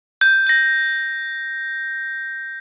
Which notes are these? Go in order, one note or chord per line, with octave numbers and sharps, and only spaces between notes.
G6
G6 A#6